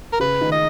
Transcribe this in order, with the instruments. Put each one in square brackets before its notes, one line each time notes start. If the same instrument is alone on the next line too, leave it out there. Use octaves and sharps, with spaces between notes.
[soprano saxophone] A#4
[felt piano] C#3 [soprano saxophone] B4
[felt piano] D#3
[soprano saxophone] D#5